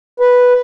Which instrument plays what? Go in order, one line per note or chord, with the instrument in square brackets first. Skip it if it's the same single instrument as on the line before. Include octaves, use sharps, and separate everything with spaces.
[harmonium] B4